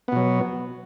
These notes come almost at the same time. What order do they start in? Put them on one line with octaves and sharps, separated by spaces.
B3 B2 F#3